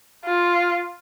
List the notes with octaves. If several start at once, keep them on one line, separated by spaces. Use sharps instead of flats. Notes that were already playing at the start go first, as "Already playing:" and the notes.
F4